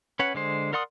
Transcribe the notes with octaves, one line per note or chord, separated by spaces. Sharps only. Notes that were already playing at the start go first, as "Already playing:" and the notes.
C#4 B4 C#5 F#5
D3 G#3 C5
A#4 D5 F#5 C6 D#6